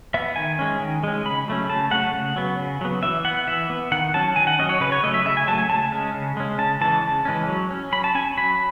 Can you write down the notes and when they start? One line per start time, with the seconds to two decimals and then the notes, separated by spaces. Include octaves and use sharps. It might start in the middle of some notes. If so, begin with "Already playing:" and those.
0.14 B3 E5
0.36 D#3 G#5
0.59 G#3 C#4
0.80 D#3
1.04 G#3 C#4
1.25 C#3 B5
1.48 F#3 A3 C#4
1.70 C#3 A5
1.91 F#3 A3 C#4 F#5
2.15 C#3
2.36 F#3 B3
2.59 C#3
2.81 F#3 B3
3.03 E3 E5
3.25 B3 F#5
3.48 E3 E5
3.70 B3
3.92 D#3 F#5
4.14 F#3 C#4 A5
4.36 D#3 G#5
4.47 F#5
4.59 F#3 C#4 D#5
4.69 C#5
4.80 C#3 B4
4.92 C#5
5.03 A3 D#5
5.07 F#3
5.14 E5
5.25 C#3 E5
5.37 G#5
5.48 F#3 A5
5.51 A3
5.58 G#5
5.70 C#3 A5
5.92 G#3 C#4
6.14 C#3
6.37 G#3 C#4
6.58 C#3 A5
6.81 E3 G#3 C#4 A5
7.03 C#3
7.25 E3 G#3 C#4
7.48 F#3
7.70 C#4
7.92 F#3 B5
8.04 A5
8.15 C#4 G#5
8.37 F#3 B5